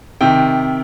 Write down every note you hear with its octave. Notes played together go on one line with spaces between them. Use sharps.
C3 D#3 G5